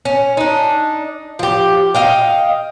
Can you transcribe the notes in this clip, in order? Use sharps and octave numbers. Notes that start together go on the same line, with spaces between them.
C#4
D4 D#4
F3 G4
D#5 F5 G5